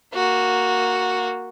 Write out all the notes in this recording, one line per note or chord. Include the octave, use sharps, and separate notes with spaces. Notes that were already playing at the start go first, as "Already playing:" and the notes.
A#3 F#4